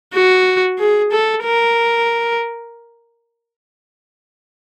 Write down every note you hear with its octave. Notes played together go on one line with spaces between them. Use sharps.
F#4
G#4
A4
A#4